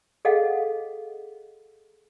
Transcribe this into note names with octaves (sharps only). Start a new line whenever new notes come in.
G#4 A4 D#5 F5 F#5